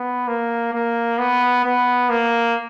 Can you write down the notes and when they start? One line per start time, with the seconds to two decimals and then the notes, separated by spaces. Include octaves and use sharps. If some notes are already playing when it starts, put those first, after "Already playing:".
Already playing: B3
0.27 A#3
0.73 A#3
1.18 B3
1.64 B3
2.09 A#3